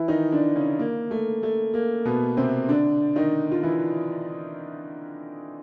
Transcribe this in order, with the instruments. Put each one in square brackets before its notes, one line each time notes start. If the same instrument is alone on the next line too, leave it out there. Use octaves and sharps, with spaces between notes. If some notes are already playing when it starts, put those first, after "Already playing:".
Already playing: [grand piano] E3 E4
D#3 D#4
D3 D4
C#3 C#4
A#3
A3
A3
A#3
B2 B3
C3 C4
D3 D4
D#3 D#4
F4
E3 E4